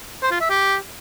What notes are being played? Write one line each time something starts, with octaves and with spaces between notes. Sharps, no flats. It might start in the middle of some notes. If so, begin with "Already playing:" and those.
C5
F4
E5
G4